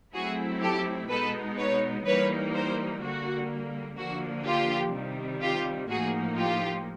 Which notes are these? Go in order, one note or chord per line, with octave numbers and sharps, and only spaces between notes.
F#3 A3 C4 E4 F#4 G#4
G4 A4
B2 G#3 B3 D#4 A4 B4
B4 C#5
E3 G3 A#3 D#4 B4 C#5
A#4 C5
D3 G3 A#3 F#4
D3 F3 A#3 D4 F#4
F4 G4
C3 D#3 G3
F4 G4
A2 F3 A#3 D#4 F#4 G#4
F4 G4